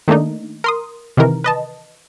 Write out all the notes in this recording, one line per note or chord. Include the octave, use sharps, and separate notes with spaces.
D#3 A3 A#3 D4 D#4
A#4 C6 D#6
C3 D#3 E3 A#4
B4 D#5 A5